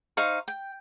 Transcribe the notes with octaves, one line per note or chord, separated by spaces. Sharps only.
D#4 C5 F5 C#6
G5